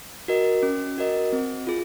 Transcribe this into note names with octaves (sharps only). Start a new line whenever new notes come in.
F#4 A#4 D#5
C#4
F#4 A#4 D#5
C4
F4 G#4